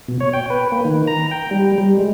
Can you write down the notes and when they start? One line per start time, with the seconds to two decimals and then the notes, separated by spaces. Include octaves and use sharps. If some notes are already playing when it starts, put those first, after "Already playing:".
0.08 B2
0.20 C#5
0.33 G5
0.50 B4
0.72 A#3
0.85 D#3
1.07 A#5
1.31 G5
1.51 G3
1.78 G3
1.99 G#3